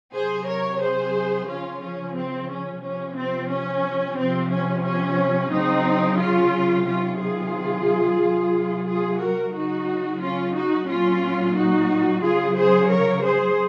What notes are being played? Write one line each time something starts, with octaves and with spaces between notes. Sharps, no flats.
C3 F#3 G#4 C5
A#4 C#5
G#4 C5
C#3 F3 C#4 F4
C#4
C4
C#4
C3 F3 C#4
C4
C#4
C3 F3 C4
C#4
C#4
C#3 F#3 C4 D#4
C#4 F4
C3 D#3 F#3 C#4 F4
F4 G#4
C3 F#3
F4 G#4
F#4 A#4
C#3 F#3 D#4 F#4
C#4 F4
D#4 F#4
A#2 F#3 C#4 F4
D#4 F#4
C#3 F#3 F4 G#4
G#4 C5
A#4 C#5
G#4 C5